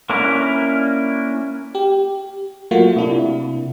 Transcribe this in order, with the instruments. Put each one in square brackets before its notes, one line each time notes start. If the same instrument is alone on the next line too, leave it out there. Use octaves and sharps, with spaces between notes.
[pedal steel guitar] A#3 C#4 D4 E4 A#4
[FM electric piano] G4
F#3 A3 A#3 F4 F#4
C3 D4 E4